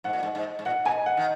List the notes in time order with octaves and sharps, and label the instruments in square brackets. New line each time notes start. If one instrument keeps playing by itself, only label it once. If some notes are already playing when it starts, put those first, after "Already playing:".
[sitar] G#2 [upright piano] F#5
[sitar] A#2
G#2
G#2
G#2
[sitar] A#2 [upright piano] F#5
[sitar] B2 [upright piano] G#5
[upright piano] F#5
[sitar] D#3